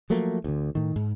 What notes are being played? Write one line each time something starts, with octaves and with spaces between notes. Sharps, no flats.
F3 F#3 A3 A#3
D2 D3
A2 D#3
G#2